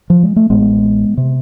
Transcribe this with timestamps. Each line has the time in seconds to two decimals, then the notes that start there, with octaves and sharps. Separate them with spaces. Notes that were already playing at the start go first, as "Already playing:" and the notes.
0.10 F3
0.23 G#3
0.36 A3
0.50 A1 A2 G#3 B3
1.17 C3